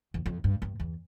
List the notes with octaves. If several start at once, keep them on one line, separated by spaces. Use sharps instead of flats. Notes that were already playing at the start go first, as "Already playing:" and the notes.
E2
F2
G2
G2
E2